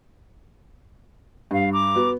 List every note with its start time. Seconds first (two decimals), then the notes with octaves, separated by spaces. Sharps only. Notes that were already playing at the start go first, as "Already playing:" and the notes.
1.51 G2 F5
1.72 A#5 D6
1.96 B3 F#4